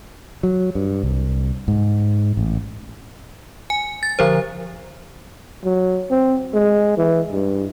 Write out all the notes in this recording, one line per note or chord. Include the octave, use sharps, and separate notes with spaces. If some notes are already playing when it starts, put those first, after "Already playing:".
F#3
G2
C2
G#2
A1
G#5
A6
D3 F3 C5
F#3
C4
G#3
E3
G2